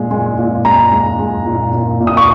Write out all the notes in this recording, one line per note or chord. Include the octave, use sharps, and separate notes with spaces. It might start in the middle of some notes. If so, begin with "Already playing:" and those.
Already playing: A#2 G#3
G#3
A#2
G#3 A#5
G#3
G#3
A#2
A#2
A#2
D#6
C#6